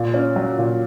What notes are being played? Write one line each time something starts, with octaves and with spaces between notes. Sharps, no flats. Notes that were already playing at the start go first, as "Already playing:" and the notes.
Already playing: A#2
C#4
F#3
A#2